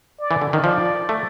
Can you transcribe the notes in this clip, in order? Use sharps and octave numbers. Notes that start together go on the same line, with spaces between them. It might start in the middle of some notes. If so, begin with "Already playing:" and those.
D5
E3
D3
D#3
F3 D5
A3